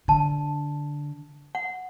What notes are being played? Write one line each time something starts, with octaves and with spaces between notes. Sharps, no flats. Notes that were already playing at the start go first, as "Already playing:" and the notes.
D3 A5
F#5